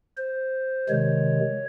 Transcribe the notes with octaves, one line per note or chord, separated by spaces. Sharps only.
C5
C3 D#3 G#3 C#5